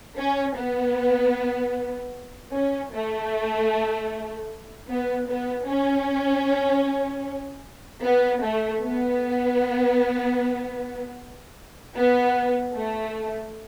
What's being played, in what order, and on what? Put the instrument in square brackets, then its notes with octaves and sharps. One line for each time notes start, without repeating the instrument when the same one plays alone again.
[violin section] C#4
B3
C#4
A3
B3
B3
C#4
B3
A3
B3
B3
A3